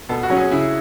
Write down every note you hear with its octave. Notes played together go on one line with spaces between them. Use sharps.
B2 A4
F#4
F#3 C#4
G#4
C#3 E4